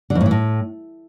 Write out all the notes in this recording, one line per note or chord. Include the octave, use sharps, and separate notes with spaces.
D3
F2
A2
E3
A2